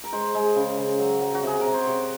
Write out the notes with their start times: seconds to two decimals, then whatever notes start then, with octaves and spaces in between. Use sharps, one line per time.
0.04 A#4
0.12 G#3 C5
0.35 G#3
0.56 C#3
0.78 C#3
0.99 F#3
1.21 F#3
1.35 F#4
1.43 C3 G#4
1.61 C3 A#4
1.74 C5
1.87 C3 C#5